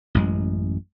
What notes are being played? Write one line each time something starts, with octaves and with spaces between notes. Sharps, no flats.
A1 F#2 G#3